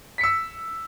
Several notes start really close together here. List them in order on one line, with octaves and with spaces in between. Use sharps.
B6 C#7 E6